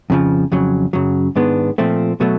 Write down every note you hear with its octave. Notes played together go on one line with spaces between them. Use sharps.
F2 C#3 F3
F2 C#3 F#3
F#2 C#3 F#3
G#2 D#3 G#3 B3 D4
A#2 F3 A3 C4
B2 F#3 A3